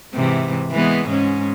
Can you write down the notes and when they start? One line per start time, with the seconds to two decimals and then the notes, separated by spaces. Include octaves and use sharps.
0.14 G#2 C3 E3
0.71 E3 G#3 B3
1.09 G#2 G#3 C#4